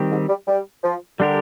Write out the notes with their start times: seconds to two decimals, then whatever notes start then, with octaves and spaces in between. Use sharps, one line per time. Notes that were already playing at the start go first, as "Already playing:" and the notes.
Already playing: D#3 G3 C4 G4
0.11 G#2
0.29 G3
0.48 G3
0.84 F3
1.20 D3 G3 D4 G4 A#4